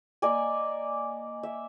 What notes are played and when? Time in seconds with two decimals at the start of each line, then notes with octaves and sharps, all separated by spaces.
0.22 A#3 D5 D#5 G#5
1.43 E5